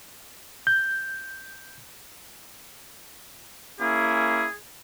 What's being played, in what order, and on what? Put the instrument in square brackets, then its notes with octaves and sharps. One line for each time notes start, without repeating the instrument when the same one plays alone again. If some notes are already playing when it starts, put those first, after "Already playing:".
[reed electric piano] G6
[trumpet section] A#3 C#4 E4 [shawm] G#4